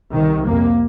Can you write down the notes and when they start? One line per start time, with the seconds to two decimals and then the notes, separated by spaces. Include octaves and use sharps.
0.15 C2 C3 D#3
0.48 F2 C3 A#3